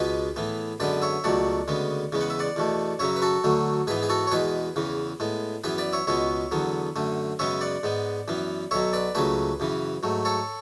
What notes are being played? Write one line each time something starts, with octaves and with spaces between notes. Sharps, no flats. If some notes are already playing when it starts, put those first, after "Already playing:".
Already playing: C#2 B2 G#3 B3 G#4 B4
A2 E3 B3
F#2 D3 G#3 B3 B4 D5
C#5 E5
C#2 B2 F#3 A3 D5 F#5
D2 C#3 G#3 B3
E2 C#3 G#3 B3
F#5
E5
D5 F#5
E2 B2 A3
F#2 C#3 F#3 C#5 E5
B4
F#4 A4
D2 D3 F#3 A3
G#2 E3 B3 G#4 B4
G#4
F#4 A4
C#5
E2 B2 G#3 G#4 B4
E2 C#3 E3
A2 G#3 B3
F#2 E3 B3 G#4 B4
B4 D5
C#5 E5
C#2 B2 G#3 B3 C#5 E5
E2 D3 F#3 B3
F#2 D3 A3
F#2 C#3 G#3 B3 C#5 E5
D5 F#5
G#2 G#3 B3
F#2 E3 B3
B1 B2 F#3 C#5 E5
B4 D5
C#2 C#3 F#3 A3 G#4 B4
F#2 C#3 E3
G#2 F#3 A3
A4 C#5